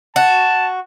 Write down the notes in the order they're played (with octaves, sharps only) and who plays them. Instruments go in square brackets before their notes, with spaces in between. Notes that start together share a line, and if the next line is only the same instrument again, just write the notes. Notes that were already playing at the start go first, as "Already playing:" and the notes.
[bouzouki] F#4 [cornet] A5